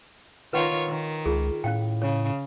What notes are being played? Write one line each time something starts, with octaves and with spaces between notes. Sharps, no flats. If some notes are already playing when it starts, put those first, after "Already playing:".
D#3 F4 B4 C#5 F#5 G5
D#3
C#2 F4 G#4
A2 C#4 F5 G5
C#3 C#5